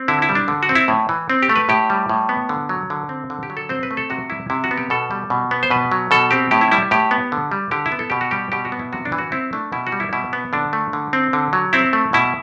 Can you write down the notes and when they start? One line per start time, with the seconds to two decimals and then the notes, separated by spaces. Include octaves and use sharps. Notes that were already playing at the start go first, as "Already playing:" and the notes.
Already playing: C4
0.08 D3 E4
0.22 E4
0.29 G3
0.35 D4
0.48 D3
0.63 F#4
0.69 C4
0.75 E4
0.88 A2
1.09 E3
1.30 C4
1.43 G4
1.49 A3
1.56 B4
1.69 A2 G4
1.90 G3
2.09 A2
2.29 B3
2.49 D3
2.69 F#3
2.90 D3
3.09 C4
3.30 D3
3.43 G4
3.50 F#3
3.57 A4
3.69 C4 C5
3.83 B4
3.91 A3
3.97 A4
4.10 C3 F#4
4.30 G3 E4
4.50 C3 E4
4.64 F#4
4.71 B3
4.78 G4
4.90 B2 A4
5.11 G3
5.30 B2
5.51 B3
5.63 C5
5.70 B2 B4
5.92 F#3
6.11 B2 A4
6.31 C4 G4
6.51 A2 G4
6.61 E4
6.71 G3 E4
6.91 A2 G4
7.11 B3
7.32 D3
7.52 G3
7.71 D3 G4
7.86 E4
7.92 B3
7.99 A4
8.10 B2 G4
8.21 F#4
8.31 G3 G4
8.52 B2 G4
8.65 F#4
8.72 B3
8.79 E4
8.92 C3 F#4
9.05 D4
9.12 E3
9.18 F#4
9.32 C4 E4
9.53 A3 D4
9.72 B2 E4
9.87 F#4
9.92 G3
10.00 E4
10.13 B2 E4
10.33 B3
10.53 D3 D4
10.73 A3
10.93 D3
11.13 C4
11.33 D3
11.53 F#3
11.73 C4 E4
11.93 A3
12.13 B2 E4